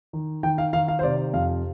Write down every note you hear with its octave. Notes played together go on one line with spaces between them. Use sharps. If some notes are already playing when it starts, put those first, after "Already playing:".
D#3
D#3 G5
F5
D#3 F5
F5
C5
C3 D5
F2 F5